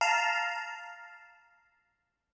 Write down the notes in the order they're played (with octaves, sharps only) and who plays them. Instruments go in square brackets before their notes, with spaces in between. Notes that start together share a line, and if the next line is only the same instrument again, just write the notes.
[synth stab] F5 A5 A#5